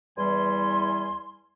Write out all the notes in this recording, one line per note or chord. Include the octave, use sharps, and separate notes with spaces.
E2 E3 G3 G#5 C6